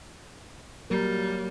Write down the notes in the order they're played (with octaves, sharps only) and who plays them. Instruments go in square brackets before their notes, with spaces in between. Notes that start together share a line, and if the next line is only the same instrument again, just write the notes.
[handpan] F#3 A#3 A#4 [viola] G3